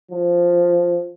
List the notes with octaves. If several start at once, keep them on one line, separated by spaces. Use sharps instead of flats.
F3